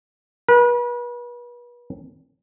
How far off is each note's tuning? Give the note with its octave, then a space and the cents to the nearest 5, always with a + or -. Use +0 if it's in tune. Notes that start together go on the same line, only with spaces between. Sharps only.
B4 -35